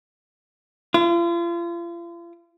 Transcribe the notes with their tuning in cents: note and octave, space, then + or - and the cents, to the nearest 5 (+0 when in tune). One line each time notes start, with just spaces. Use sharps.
F4 -40